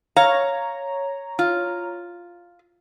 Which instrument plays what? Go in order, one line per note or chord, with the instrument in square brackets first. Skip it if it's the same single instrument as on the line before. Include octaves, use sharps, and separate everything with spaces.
[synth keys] C#5 A#5 [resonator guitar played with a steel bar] F5
[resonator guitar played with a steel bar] F4